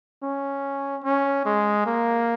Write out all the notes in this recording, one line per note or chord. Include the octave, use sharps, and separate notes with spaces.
C#4
C#4
G#3
A#3